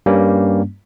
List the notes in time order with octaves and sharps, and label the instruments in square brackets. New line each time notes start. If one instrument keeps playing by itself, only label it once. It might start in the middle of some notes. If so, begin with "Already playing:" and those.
[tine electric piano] G2 G3 A#3 C#4